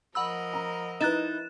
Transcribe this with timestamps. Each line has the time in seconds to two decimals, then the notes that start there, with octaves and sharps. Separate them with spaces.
0.15 F3 A#4 D#5 F#5 B5 E6
0.54 A#5
1.01 D#4 E4 B4 F#6 A6 E7